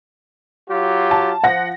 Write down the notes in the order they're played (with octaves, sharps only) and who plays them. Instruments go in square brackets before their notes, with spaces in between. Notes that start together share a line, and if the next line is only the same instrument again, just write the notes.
[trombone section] F#3 F4 G4
[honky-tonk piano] A5
[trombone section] F3 [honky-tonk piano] F#5 A#6